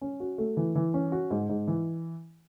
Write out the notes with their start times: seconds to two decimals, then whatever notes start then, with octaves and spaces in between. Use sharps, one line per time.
0.01 C#4
0.20 F#4
0.38 A3
0.57 E3
0.76 E3
0.94 C#4
1.12 F#4
1.31 G#2
1.49 G#2
1.68 E3